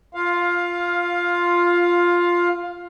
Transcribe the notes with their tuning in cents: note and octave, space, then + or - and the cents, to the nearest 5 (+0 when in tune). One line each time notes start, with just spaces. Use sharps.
F4 +0 F5 +15